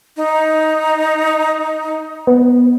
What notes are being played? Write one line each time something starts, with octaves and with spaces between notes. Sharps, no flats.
D#4
B3